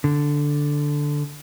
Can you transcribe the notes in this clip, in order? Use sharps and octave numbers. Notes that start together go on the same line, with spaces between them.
D3